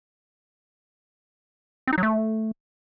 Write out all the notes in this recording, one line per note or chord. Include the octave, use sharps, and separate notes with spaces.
C4
D#4
F#3
A3